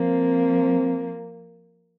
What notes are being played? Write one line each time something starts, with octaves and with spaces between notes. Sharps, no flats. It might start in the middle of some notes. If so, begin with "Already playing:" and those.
Already playing: F3 A#3 C4